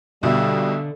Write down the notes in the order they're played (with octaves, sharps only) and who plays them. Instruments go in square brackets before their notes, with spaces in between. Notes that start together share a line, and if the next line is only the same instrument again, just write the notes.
[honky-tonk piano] B1 B2 [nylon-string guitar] D3 [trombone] G3 [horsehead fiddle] E5